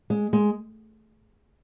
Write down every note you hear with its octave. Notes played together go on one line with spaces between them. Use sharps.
G#3
G#3